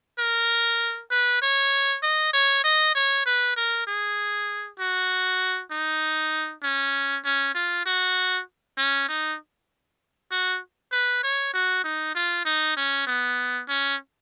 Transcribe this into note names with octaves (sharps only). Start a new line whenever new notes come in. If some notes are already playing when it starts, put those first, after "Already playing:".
A#4
B4
C#5
D#5
C#5
D#5
C#5
B4
A#4
G#4
F#4
D#4
C#4
C#4
F4
F#4
C#4
D#4
F#4
B4
C#5
F#4
D#4
F4
D#4
C#4
B3
C#4